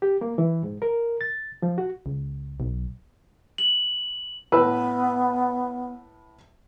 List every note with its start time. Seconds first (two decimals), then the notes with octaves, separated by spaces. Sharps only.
0.02 G4
0.21 A#3
0.38 E3
0.63 G#2
0.82 A#4
1.21 A6
1.62 F3
1.78 F#4
2.06 C#2
2.60 B1
3.58 F#7
4.52 A2 B3 B4 E6